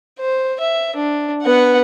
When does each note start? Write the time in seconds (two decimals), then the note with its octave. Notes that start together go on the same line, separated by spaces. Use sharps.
0.20 C5
0.60 E5
0.96 D4
1.42 B3 F#5